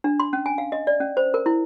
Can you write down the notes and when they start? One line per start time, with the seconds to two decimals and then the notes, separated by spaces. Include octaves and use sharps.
0.04 D4
0.20 C6
0.33 C#4
0.46 G#5
0.58 F5
0.72 D#5
0.87 D5
1.00 C#4
1.17 C5
1.34 A#4
1.46 E4